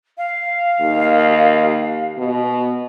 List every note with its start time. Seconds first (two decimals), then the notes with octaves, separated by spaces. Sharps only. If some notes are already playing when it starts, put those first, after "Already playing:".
0.17 F5
0.81 D#2
2.18 B2